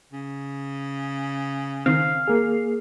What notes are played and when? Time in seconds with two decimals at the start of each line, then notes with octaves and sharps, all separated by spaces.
0.13 C#3
1.86 D#3 C4 F5
2.28 A#3 G#4